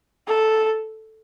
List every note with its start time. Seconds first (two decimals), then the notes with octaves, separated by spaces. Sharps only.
0.27 A4